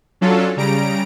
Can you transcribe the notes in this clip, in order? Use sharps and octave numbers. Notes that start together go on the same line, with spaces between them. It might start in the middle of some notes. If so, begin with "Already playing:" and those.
F#3 C#4 D4 F4 A4
C#3 G3 A#5 D7